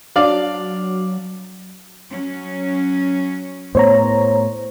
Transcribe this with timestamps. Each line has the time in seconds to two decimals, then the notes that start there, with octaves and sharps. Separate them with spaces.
0.16 F#3 D4 D5 F5
2.10 F#3 C#4
3.75 A2 B3 C5 C#5 A#5